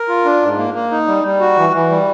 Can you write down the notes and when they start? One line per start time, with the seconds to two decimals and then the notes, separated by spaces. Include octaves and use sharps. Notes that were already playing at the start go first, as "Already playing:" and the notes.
Already playing: A#4
0.09 F4
0.25 D4
0.42 G#2
0.58 A#3
0.74 A#3
0.91 D#4
1.07 G3
1.24 G3
1.40 F#4
1.57 E3
1.73 E3
1.90 G3